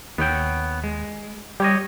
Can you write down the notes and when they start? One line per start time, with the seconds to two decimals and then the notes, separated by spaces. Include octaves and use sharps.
0.18 D#2 B3 C#5 G5
0.84 G#3
1.60 G3 G4 C#5 D#5